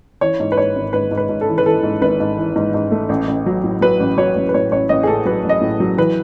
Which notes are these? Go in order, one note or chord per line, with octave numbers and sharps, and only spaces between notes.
E3 C#5
G#2
B4
G#2 C#5
G#1
G#2 B4
G#2
B4
G#2
A4
E3
B4
E3 A4
G#2
G#1 B4
G#2
E3
G#2
G#2
A3
A1
A1
F#3
A2
F#3 B4
A1
F#3 C#5
A1
B4
A2 C#5
A1 C#5
A1 D#5
G#4
A2 A4
F#3 B4
A1 D#5
A2
F#3
E3 B4